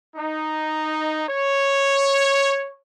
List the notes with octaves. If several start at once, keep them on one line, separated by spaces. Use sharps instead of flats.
D#4
C#5